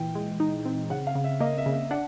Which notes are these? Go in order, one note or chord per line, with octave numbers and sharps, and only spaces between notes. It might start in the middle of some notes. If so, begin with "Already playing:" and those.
Already playing: A#2 E3 G5
G#3
D#4
C4
C#3 F#5
F5
C#3
E5
A#3 D#5
E5
C#3
E5
D4 F#5